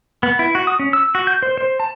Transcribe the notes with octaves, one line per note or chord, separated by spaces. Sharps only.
B3
E4
F#4
D#6
C#4
E6
F#4
G6
C5
C5
A5